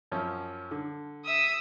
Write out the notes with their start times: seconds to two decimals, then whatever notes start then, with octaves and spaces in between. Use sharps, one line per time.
0.12 F#2 F3 C#4
0.71 D3
1.25 E5 D#6 E6